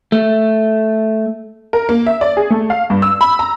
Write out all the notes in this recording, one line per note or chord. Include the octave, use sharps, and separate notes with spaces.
A3
A#4
A#3
E5
D5
G#4
A3
F5
G2
E6
B5
A#5